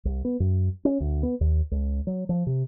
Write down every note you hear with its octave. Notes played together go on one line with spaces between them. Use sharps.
C2
B3
F#2
C#4
D2
B3
D#2
C#2
F#3
F3
C3